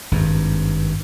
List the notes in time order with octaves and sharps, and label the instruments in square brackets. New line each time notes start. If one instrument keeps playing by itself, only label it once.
[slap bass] G#1 G2